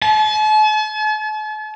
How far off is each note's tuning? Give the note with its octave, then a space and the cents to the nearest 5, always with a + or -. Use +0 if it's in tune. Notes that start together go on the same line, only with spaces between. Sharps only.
A5 -45